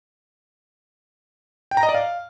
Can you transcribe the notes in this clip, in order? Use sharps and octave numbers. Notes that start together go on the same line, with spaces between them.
G5
A#5
D#5
D5
F5